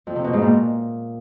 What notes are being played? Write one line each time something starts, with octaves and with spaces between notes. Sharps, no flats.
F2
C3
B2
G#2
A#2